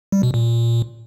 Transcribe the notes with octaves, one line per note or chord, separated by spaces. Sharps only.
G3
B2
A#2